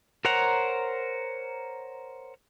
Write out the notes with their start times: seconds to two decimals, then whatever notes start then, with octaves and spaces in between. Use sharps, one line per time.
0.25 A#4 C5 C#5 F#5 A#5